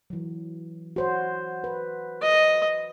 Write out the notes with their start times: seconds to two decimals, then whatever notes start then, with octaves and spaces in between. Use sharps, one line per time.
0.10 E3 F#3
0.96 F#4 C5 C#5
1.64 B4
2.22 D#5